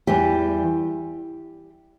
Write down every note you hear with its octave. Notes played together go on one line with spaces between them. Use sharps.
E2 E3 G3 G4